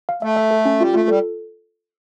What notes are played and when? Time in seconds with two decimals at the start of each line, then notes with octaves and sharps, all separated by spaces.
0.09 F5
0.22 A3 E5
0.36 E5
0.51 A4
0.65 C#4
0.80 G3 F4
0.94 A3 F4
1.08 G3 A4